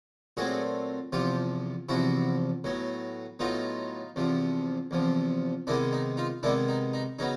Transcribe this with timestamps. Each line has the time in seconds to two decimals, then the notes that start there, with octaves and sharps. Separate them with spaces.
0.37 A#2 F#3 A3 C4 F#4 G#4
1.12 E2 C3 F3 F4 G4
1.89 E2 C3 F3 E4 F#4
2.64 A2 F#3 B3
3.39 A2 F#3 B3 D#4 F4
4.16 E2 C3 F3
4.91 E2 C3 F3
5.67 C3 D#3 G#3 B3 D4 E4
5.93 D#4
6.17 D#4 F4
6.43 C3 D#3 G#3 B3 D4 E4
6.68 D#4
6.93 D#4
7.19 C#3 F#3 B3 D#4